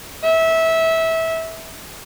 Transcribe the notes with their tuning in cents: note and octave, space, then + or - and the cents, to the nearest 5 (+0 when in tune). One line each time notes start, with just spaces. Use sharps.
E5 -20